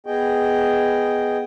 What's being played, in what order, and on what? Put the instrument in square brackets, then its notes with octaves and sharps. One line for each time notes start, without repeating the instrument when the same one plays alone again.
[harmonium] B3 G#4 D#5 G5